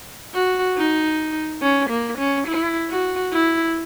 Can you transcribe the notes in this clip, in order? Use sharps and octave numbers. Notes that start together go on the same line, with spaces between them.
F#4
D#4
C#4
A#3
C#4
E4
F#4
E4